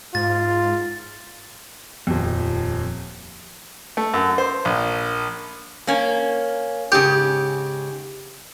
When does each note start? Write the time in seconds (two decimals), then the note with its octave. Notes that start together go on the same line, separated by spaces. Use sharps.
0.15 G#2 F4 A6
2.07 D#1 F2
3.97 A3
4.14 F#2
4.38 C5
4.65 A#1
5.87 A#3 C#4
6.92 G#2 C#3 G4